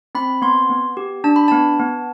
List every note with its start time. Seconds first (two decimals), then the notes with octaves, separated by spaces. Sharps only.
0.15 C4 B5
0.42 B3 C6
0.69 B3
0.97 G4
1.24 D4 A5
1.36 B5
1.48 B3 A5
1.80 B3